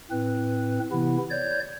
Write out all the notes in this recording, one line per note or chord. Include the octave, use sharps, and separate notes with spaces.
A2 C4 B4
C3 E3 B3 E4
C#5 D5 G6